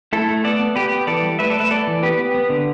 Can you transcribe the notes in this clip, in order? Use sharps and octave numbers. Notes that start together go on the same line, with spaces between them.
A3 E4 A4
A3
B3 A4 D5
B3
B3 G4 B4
B3
E3 A4 D5
G3
A3 B4 E5
A4 D5
A3 B4 E5
B3 A4 D5
E3
B3 G4 B4
B3
B3
D3